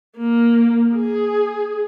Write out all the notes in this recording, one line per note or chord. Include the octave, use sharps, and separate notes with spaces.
A#3
G#4